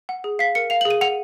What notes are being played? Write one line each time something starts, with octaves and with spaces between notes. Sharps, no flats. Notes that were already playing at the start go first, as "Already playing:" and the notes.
F#5
G#4
F5 B6
A#4 C#7
F5 F7
F#7
G#4
D#7
F#5 F7